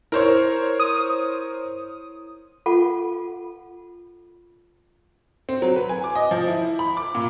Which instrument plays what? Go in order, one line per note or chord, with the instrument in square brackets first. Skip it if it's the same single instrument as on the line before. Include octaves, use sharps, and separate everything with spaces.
[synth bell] E4 [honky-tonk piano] A#4 C5 C#5
[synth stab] D#6
[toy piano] F4 A4 F#5
[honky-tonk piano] C4
F#3
B4
G#5
D6
D#5
F3
E4
B5
D6
A#2